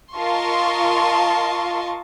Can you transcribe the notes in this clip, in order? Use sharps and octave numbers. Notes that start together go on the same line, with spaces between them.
F4 A#4 D#5 A5 C6 C#6